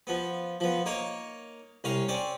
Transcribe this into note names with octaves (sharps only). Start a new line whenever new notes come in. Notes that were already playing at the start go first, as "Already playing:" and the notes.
F3 B3
F3 B3
A#3 D#4 C#5
C2 C#4 F5 A#5
C4 C#4 D5